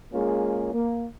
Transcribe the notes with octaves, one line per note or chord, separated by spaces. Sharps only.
G#3 A#3 C#4 F4 G#4
A#3